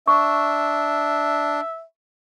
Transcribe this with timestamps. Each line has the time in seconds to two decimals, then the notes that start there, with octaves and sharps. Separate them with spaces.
0.08 D4 E5 C#6